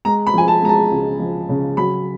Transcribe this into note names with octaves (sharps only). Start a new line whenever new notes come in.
G#3 A#5
B5
F3 G#5
A5
G#3 A#5
A5
C#2
F3
C#3
F#3 B5